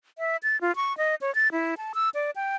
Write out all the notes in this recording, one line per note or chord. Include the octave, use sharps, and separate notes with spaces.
E5
A6
F4
C#6
D#5
C#5
A6
E4
A5
E6
D5
G5